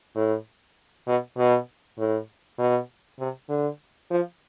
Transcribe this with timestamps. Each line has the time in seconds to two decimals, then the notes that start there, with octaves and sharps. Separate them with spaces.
0.16 A2
1.07 B2
1.38 B2
1.99 A2
2.59 B2
3.20 C3
3.49 D3
4.11 F3